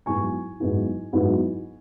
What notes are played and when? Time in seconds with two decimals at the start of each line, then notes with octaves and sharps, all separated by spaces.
0.06 G#2 F#3 B3 E4 G#5 C#6
0.60 G#2 F#3 B3 E4
1.13 G#2 F#3 B3 E4